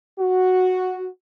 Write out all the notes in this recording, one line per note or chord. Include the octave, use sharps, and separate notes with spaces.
F#4